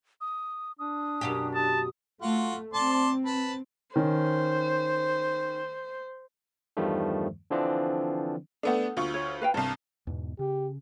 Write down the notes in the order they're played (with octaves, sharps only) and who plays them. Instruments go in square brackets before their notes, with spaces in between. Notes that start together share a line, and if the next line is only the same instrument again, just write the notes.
[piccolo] D#6
[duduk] D4 [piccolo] D#6
[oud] F#2 B2 G4
[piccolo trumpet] A5 [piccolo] D#6
[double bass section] A3 [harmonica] F4 F#4
[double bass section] C4 [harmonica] D5 A5 C6
[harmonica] B4 A5
[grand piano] D#3 C#4 [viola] C5
[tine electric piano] E2 G2 D#3 F3 G3 A3
D3 E3 F3 C4 D4
[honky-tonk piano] A3 B3 D4 [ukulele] A4 F#5
[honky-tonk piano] D2 F4 C#6
[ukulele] C#5
B4 F5 G5
[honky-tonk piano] C2 G2 [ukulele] A5
[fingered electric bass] E2 G#2 B2
[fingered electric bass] C#3 [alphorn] G4